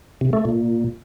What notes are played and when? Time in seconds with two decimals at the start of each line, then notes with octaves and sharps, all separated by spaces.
0.21 C3
0.33 A3
0.45 A#2